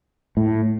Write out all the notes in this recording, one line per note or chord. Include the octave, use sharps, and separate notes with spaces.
A2